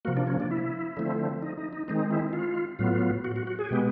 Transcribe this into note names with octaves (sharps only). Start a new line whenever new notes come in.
C3 F3 A#3 F#4
D4
C#4
D4
E4
D3 F3 A3 C4
D#4
D#4
D#4
D#3 G#3 C4 D#4
E4
F4
A2 F#3 B3 F4
F#4
F#4
F#4
G#4
B2 G#3 B3 G4